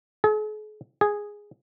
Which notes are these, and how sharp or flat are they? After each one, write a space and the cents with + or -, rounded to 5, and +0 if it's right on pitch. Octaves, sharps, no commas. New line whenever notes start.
G#4 +45
G#4 -5